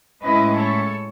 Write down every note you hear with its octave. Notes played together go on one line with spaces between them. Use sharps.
A2 G#3 C#4 E4 B4 D#5
A4 C#5